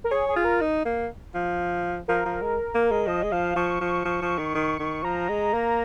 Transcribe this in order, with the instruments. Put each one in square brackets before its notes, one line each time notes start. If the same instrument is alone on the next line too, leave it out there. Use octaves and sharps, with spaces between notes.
[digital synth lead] A#4
[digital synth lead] G#4 [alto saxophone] C#5
[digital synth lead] G#4
[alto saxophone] F4
[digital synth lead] A#4
[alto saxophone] D#4
A#3
F3
[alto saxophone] F3 [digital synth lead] A#4
[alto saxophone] F3
G#3
A#3
G#3
[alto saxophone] F3 [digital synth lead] D#5
[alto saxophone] G#3
[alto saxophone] F3 [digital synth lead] F5
[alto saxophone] F3 [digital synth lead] C#6
[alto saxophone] F3
F3
F3
D#3
D#3
D#3
[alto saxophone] F3 [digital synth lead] A#5
[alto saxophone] G#3
A#3